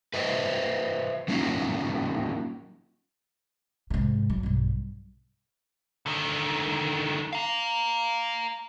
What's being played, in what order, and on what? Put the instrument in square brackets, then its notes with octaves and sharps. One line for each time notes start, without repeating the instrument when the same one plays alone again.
[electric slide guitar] B4 C5 D#5 E5
F#3 A#3 C#4 D#4 F4
[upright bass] G#2 C3
F#3
B1 G2
[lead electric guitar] D3 D#3
F5 A#5